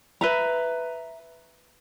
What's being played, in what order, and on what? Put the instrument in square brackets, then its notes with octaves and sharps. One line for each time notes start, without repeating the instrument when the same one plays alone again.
[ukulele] B4 E5 A#5